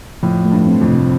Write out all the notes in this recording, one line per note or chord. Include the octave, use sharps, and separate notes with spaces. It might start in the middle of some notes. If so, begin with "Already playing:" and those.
F2 A2 F3
A3
G2
C4
F2
C3